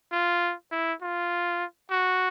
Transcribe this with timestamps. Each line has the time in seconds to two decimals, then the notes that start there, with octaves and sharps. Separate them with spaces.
0.12 F4
0.72 E4
1.02 F4
1.91 F#4